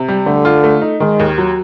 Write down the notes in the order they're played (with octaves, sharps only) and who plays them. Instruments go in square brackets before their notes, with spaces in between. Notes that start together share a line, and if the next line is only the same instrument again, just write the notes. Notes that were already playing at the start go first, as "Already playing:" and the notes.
Already playing: [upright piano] C3
G3
[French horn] D3 [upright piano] A3
[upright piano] F4
A3
D#4
[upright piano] D#3 [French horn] G#3
[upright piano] D#2
F#3